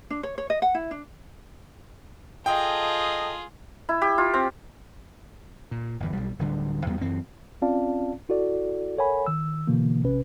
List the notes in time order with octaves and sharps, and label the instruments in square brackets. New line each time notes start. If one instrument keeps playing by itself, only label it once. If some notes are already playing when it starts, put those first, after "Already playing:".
[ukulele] D4
C#5
C#5
D#5
F#5
E4
D4
[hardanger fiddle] F4 G#4 [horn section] A4 D#5 [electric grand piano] G5
[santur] E4
G4
F4
C4
[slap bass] A#2
G1 E2
B1 G3
D1 D2 D3 G3
E2 G3 G#3 B3
F#2 E3 C4
[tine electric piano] C4 C#4 F4 D5 F5 A5
E4 F#4 A4 D5
A4 A#4 C#5 F#5 G#5 B5
D#3 E6
B2 D3 E3 A#3
A#1 C3 C#4 B4